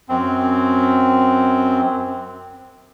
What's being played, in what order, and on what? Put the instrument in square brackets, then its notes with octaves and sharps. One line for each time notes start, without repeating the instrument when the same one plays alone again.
[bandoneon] F#2 C4